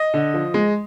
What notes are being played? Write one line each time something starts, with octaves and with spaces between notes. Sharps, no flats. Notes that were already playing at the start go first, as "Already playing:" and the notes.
Already playing: D#5
D3
F3
G#3